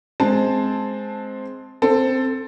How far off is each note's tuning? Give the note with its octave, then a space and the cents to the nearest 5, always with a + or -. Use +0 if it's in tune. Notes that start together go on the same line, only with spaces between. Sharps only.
G#3 +15 C4 +0 A5 +0
C4 +0 A4 +10